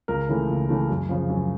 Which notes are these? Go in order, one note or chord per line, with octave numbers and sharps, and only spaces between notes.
C#2 A#4
C#3 E3 A3
C#2
C#3 E3 A3
F#2
C#3 F3
F#2